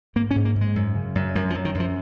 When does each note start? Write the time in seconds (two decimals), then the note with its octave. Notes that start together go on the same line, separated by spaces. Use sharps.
0.16 G#2 A#3
0.31 C#4
0.36 G#2
0.45 A#3
0.56 G#2
0.61 G#3
0.76 F#2
0.96 C#3
1.15 F#2
1.35 F#2 F#3
1.50 F3
1.55 F#2
1.65 D#3
1.75 F#2
1.80 F3